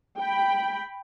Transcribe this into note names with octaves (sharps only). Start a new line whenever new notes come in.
G5 B5